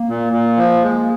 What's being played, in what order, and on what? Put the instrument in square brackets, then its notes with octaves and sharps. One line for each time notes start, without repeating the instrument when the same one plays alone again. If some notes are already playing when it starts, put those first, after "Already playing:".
Already playing: [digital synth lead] A#3
[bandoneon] A#2
A#2
F3
G#3